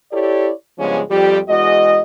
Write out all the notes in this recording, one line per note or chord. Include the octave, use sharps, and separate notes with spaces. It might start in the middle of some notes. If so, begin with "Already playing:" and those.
E4 G4 A4 C#5 D5
G2 C#3 F3 G#3 B3 C#4
F2 F3 G3 G4
E2 G#3 F#4 D#5